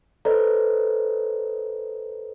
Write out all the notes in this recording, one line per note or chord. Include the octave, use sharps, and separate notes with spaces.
A4 B4 C5 D5 D#5 A#5